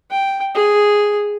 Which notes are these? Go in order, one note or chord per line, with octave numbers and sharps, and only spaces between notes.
G5
G#4